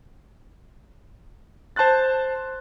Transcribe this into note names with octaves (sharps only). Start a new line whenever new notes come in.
C5 A5 C6 F#6 A6